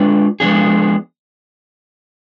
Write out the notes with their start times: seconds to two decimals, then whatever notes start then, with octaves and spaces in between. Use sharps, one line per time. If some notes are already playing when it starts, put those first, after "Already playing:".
Already playing: G#3 D4 F4 B4 D5
0.40 F3 G#3 B3 D4 G#4